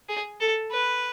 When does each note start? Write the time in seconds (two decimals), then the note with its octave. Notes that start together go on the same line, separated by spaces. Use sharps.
0.09 G#4
0.40 A4
0.71 B4